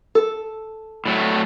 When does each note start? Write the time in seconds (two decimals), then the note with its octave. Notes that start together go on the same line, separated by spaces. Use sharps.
0.15 A4
1.05 A2 F#3 A3